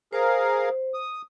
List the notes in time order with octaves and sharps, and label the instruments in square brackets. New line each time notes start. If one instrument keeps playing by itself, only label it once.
[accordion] G#4 A#4 F5 [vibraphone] C5
[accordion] D#6